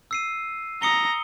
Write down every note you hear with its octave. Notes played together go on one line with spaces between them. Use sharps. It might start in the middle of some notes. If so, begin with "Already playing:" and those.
E6 C7 D#7
A#5 D#6 A#6 C#7 G7